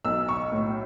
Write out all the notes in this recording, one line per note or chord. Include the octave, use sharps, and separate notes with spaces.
B1 E6
C#6
A2